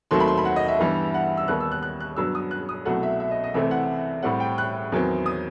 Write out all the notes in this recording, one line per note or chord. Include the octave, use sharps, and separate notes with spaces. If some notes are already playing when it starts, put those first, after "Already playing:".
D#2 D#3 F#3 A3 C4 C6
B5
C6
B5
F#5
D#5
E5
G2 E3 G3 B3
F#5
E6
D#2 D#3 G3 B3 F#6
E6
F#6
F#6
F#6
G2 F#3 B3 E6
D#6
F#6
D#6
C2 B2 F#3 A3 F#5
E5
E5
D#5
D#5
C2 C3 E3 A3 C4 E5
F#5
A2 G3 C4 F#5
G5
F#6
E2 D#3 F#3 C4
D#6